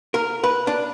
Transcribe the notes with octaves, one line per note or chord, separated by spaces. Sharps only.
A#4
B4
D4